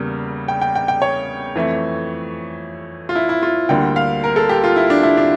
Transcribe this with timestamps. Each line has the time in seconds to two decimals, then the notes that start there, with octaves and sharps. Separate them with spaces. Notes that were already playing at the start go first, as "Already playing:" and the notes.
Already playing: E2 C#3 G3 A#3
0.48 G5
0.61 G5
0.75 G5
0.88 G5
1.02 C#5
1.56 F2 E3 A3
3.09 F4
3.15 E4
3.29 E4
3.43 F4
3.69 D2 D3 G3 A#3 G5
3.96 F5
4.24 A#4
4.36 A4
4.49 G4
4.64 F4
4.76 E4
4.90 D4
5.03 E4
5.17 D4